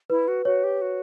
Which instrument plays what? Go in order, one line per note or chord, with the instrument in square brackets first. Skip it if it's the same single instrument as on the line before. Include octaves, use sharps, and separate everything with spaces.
[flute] E4 [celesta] B4
[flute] F#4
[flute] F#4 [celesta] C#5
[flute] G4
F#4